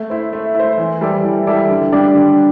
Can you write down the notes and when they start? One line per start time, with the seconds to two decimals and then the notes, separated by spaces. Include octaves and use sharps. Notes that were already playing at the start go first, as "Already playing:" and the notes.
Already playing: A3
0.10 E4 C5
0.33 A3
0.55 E4 C5
0.78 E3
1.01 G3 E4 A4 D5
1.24 E3
1.47 G3 E4 A4 D5
1.69 D3
1.92 G3 D4 G4 D5
2.15 D3